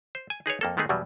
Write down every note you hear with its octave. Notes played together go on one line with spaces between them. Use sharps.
C5
G#5
D#4 G#4 B4 C#5
F2 A#3 A4
D#3 G#3 A3 B3 D#4 G#4
E2 B2 F#3 G3